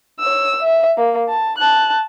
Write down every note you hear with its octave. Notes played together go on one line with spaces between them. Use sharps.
C#5 E6
E5
A#3
A5
A5 F#6